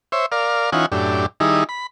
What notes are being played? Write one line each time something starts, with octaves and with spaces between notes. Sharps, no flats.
C5 C#5 E5
A#4 D5 F5
E3 C#4 D#4 F4 F#5 G#5
F#2 A2 D4 G4
D#3 G3 D#4 E4 G#4
B5